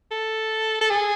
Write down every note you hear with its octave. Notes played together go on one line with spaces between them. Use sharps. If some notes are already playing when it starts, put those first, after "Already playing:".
A4
A4
G#4